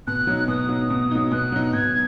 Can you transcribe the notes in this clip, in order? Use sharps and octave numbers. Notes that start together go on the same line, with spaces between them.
B2 F#6
F#3 D#4
B2 D#6
F#3 D#4
B2
F#3 D#4
B2 F#6
F#3 D#4
B2 G#6